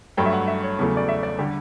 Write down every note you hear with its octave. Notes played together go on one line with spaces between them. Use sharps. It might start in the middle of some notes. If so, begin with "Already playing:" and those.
G2 F#3 A3 G5
E5
F#5
E5
C#5
E2 C#3 F#3 A3
D5
E5
D5
D3 G3 G4